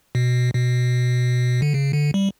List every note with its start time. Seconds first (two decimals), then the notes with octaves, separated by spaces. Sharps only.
0.15 B2
0.54 B2
1.62 D3
1.74 C#3
1.93 D3
2.14 G3